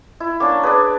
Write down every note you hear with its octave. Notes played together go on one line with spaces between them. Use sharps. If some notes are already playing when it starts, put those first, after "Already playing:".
E4
A#3 C#4 D4
D4 G#4 B4